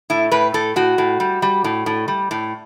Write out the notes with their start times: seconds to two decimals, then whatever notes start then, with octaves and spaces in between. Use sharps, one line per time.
0.10 A2 E4
0.32 A2 B4
0.54 A2 A4
0.76 A2 F#4
0.98 A2
1.20 G3
1.42 G3
1.64 A2
1.86 A2
2.08 G3
2.31 A2